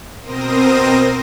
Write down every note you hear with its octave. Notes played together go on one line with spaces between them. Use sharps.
B2 C4 A#4 C5 D#6 A#6